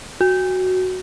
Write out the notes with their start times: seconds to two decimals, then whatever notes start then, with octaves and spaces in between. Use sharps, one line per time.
0.21 F#4